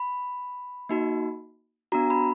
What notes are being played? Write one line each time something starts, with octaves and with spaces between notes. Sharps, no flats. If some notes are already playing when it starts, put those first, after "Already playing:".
Already playing: B5
A#3 D#4 F#4
B3 D4 F#4 A#5
B5